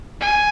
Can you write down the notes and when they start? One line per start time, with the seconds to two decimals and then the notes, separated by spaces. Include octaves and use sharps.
0.21 G#5